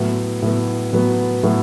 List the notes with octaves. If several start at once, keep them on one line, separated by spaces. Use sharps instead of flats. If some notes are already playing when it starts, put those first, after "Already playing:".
Already playing: A2 F#3 B3
A2 F#3 B3
A2 F#3 B3
A2 F#3 B3